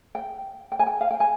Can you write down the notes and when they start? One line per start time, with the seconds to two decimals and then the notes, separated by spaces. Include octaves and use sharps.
0.15 G5
0.72 G5
0.79 G#5
0.86 G5
1.01 F5
1.11 G5
1.20 G#5